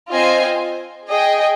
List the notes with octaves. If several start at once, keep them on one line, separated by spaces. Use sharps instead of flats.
C4 F4 C5 D#5 G#5
G#4 D#5 G5